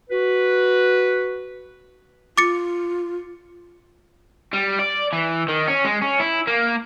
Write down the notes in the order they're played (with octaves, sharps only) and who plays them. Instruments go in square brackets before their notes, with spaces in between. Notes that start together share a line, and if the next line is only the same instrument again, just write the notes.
[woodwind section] F#4 B4
[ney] F4 [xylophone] D6 A6 C#7
[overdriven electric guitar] G3
D5
E3
D#3
C#4
G#3
C#4
E4
A#3